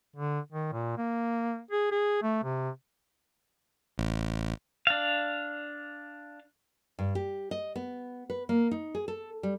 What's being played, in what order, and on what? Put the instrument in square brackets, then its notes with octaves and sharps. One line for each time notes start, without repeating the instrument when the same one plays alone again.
[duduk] D3
D#3
A#2
A#3
G#4
G#4
A3
C3
[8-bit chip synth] A1
[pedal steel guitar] D4 F5
[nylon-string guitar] G2
G4
D#5
B3
B4
A#3
D#4
G#4
A4
G3